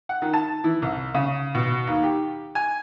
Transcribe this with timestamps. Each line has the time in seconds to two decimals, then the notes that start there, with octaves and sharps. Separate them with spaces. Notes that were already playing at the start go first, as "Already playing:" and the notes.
0.09 F#5
0.22 D#3
0.34 A5
0.64 E3
0.82 C2
1.14 C#3
1.55 B2
1.87 D#2
2.03 G4
2.55 G#5